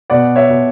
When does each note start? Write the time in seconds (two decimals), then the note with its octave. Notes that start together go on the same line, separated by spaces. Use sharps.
0.10 B2 D5 F#5
0.36 C#5 E5
0.49 B2